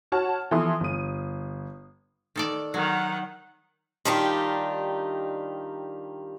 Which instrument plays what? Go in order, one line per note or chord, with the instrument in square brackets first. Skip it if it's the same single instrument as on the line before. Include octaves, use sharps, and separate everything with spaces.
[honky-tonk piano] F#4 C#5 F#5 A5 F6
E3 F3 B3 A4 C6 D#6
G1 D#7
[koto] D#3 A4 D5
[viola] D#3 F#5 [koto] F#3
[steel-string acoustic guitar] D#3 G3 D4 D#4 F4 G4